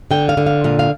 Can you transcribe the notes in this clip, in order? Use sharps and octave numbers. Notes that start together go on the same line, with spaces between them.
D3 G5
F5
D3
F5
A#2 F5
F5